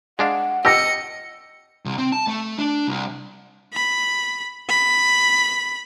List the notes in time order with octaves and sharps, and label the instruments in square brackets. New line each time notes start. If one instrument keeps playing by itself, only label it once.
[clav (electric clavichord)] G#3 D4 F5 [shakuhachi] F#5
[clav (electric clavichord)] G4 [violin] D#5 C#7 [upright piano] E6 A#6
[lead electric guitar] C2
C4
A5
A3
D4
C2
[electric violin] B5
B5